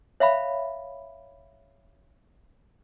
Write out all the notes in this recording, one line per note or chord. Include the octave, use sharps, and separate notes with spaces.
C#5 E5 F5 B5